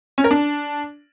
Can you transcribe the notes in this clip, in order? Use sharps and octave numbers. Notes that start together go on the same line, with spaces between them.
C#4
A#4
D4